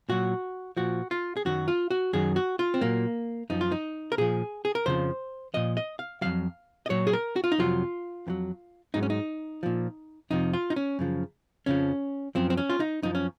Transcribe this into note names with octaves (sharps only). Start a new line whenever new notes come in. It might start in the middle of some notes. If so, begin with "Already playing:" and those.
A#2 F#3 F#4
A#2 F3 F#4
F4
G#4
F#2 D#3 F#3 F#4
F4
F#4
F#2 D#3 F#3 G#4
F#4
F4
C4
A#2 F#3 A#3
F#2 F3 D#4
F4
D#4
A#4
A#2 F3 G#4
G#4
A#4
F2 C#3 F3 C5
A#2 F3 D#5
D#5
F5
F2 C3 F#3 F5
D#5
A#2 F#3 C#5
G#4
A#4
F#4
F4
D#4
F2 C3 F#3 F4
F2 D#3 F#3
G#2 F#3 D#4
C#4
D#4
A#2 F3
F2 C3 F3 D#4
F4
D#4
C#4
F#2 C#3 F3
F2 C#3 F3 C#4
F#2 F3 C4
C4
C#4
F4
D#4
F#2 F3 D#4
C#4